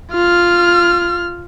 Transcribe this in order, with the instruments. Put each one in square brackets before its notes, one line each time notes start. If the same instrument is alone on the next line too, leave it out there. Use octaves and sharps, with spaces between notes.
[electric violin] F4 F6